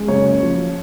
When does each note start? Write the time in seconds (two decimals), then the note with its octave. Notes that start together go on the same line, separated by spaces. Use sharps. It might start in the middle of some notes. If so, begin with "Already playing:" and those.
Already playing: G#3
0.08 F#1 C#5
0.25 F#2
0.43 F3